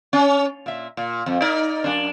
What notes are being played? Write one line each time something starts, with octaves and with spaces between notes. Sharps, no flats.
C#4
A#2 E5
A#2
F2
D#4 A#4 D5
F#2 D4